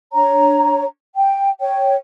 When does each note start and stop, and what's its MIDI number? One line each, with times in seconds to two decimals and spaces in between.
0.14 0.83 62
0.14 0.83 73
0.14 0.83 82
1.16 1.49 79
1.60 1.94 73
1.60 1.94 79